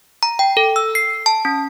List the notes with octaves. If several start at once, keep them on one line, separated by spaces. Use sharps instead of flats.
A#5
G5
A4
E6
C7
A5
C#4